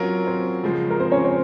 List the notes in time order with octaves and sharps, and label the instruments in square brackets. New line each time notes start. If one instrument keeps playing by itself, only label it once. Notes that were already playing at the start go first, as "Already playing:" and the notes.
Already playing: [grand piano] F#3 C#4 F4 A#4 [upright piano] C4
[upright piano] C4 C5
[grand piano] C#3 F3 G#3
[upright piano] A#4
C4 C5
C#4 C#5
C4 C5